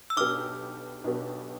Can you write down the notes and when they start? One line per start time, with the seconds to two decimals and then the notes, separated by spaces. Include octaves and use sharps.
0.10 E6
0.17 B1 B2 B3 D4 G4 D6 F6
1.04 B1 B2 B3 D4 G4